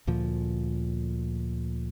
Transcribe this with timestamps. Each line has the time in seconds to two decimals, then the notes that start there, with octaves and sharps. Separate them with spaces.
0.07 D2 A#2 F3